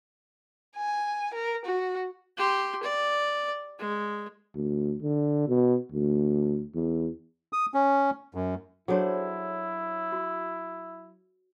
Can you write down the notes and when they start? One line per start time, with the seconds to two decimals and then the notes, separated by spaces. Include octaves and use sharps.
0.76 G#5
1.34 A#4
1.65 F#4
2.37 G4 C6
2.83 D5
3.79 G#3
4.55 D2
5.02 D3
5.48 B2
5.92 D2
6.75 E2
7.53 D#6
7.74 C#4
8.35 F#2
8.88 F#3 D4 E4 G#4 A4 C5 C#5
10.12 F#4